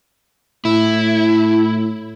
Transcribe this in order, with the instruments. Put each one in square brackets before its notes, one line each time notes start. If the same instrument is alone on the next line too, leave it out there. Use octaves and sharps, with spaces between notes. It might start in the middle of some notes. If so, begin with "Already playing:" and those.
[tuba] A2 [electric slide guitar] E4